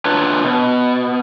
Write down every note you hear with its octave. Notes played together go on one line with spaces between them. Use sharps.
D4 F4 B4 C#5
B2